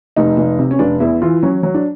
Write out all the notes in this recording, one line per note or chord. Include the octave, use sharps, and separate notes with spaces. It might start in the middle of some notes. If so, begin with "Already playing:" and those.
F1 D#4
F1
C3
C#4
F1 D4
E2 E4
E3 F4
F#3 C#4
F#3
D4